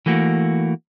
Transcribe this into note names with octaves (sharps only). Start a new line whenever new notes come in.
E3 A3 A#3 F#4